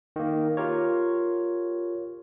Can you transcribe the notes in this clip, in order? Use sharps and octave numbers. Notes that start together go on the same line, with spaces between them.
D#3 A#3
F4 G4 A#4 C#5